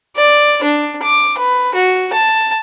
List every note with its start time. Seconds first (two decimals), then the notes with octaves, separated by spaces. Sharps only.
0.17 D5
0.64 D4
1.03 D6
1.38 B4
1.74 F#4
2.13 A5